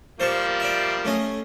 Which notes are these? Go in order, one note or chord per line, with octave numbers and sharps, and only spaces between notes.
F3 G3 A#3 C5 A5 C#6
D5 E5
A3 C#4 D#5